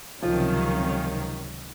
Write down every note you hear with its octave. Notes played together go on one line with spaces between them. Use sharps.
C#2 C3 D#3 F3 F#3 C#4 F4